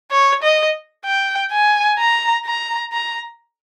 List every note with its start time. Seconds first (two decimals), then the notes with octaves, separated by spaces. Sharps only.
0.11 C#5
0.43 D#5
1.05 G5
1.52 G#5
1.99 A#5
2.46 A#5
2.93 A#5